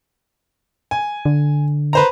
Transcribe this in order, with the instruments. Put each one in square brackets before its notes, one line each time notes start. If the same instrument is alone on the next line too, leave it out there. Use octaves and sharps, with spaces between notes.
[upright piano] G#5
[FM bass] D3
[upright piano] B4 C5 A#5